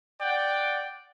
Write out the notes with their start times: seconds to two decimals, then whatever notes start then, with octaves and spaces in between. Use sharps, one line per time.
0.21 D5 F#5 G5